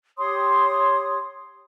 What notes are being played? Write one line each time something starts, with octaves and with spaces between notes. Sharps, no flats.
G4 C#5 C6 D#6